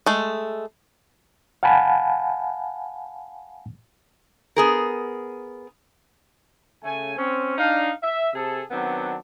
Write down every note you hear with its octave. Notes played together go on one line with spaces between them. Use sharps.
G#3 A3
F5 F#5 G#5 A5 B5
B3 G#4 A#4
C#3 A3 G#5
C4 C#4
D4 D#4 F5
E5
C3 G#4 A4
D#3 F#3 B3 C4 D4